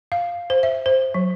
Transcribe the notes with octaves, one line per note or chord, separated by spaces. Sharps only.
F5
C5
E5
C5
F#3